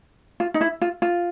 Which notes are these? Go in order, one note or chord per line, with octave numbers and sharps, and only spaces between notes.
F4
D#4
E4
F4
F4